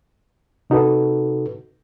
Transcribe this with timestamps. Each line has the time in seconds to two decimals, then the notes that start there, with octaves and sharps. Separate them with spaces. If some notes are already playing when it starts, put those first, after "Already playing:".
0.70 C3 D#4 F#4 A4 B4